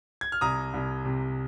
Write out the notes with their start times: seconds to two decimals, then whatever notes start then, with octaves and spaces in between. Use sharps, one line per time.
0.21 G#6
0.32 F6
0.41 C2 A#5 D#6
0.74 C2
1.05 C3